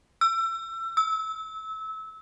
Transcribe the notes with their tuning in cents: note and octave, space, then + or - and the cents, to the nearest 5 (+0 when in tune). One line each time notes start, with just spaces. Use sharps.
E6 +30
E6 -25